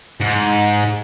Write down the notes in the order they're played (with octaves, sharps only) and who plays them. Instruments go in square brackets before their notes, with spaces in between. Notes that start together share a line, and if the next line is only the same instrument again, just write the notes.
[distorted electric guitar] G#2